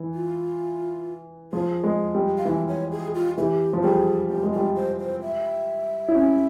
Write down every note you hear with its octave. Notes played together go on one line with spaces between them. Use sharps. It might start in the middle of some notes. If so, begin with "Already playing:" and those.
Already playing: E3
F4
F3 G#4
G#3
G3
F5
E3 E5
C#5
G#4
F4
E3 G4 G#4
F3
G3 G#4
G3 G4
G#3
G3 F4
C5
C5
E5
E4
C#4